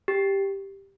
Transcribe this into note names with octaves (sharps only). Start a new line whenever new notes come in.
G4